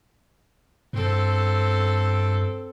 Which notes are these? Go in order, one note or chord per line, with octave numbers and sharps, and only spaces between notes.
G2 C4 A4